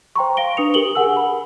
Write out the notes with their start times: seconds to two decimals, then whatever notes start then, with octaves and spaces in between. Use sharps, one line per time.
0.16 C5 G5 A#5 C6 C#6
0.37 F5 A#6 D7 G7
0.57 D4 B4 D#6 C#7 F7
0.74 G4 A#4 F#7 G7
0.95 G#4 A#4 F#5 G#5 E6
1.17 B5